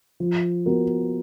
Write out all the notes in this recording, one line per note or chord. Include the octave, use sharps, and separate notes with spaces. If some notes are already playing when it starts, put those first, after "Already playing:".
F3
B3 F#4 A#4